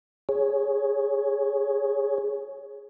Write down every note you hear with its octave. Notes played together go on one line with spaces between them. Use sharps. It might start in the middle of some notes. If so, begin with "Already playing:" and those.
G#4 C#5